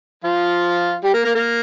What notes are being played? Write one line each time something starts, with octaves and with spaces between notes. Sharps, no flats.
F3 F4
G3 G4
A#3 A#4
A#3 A#4
A#3 A#4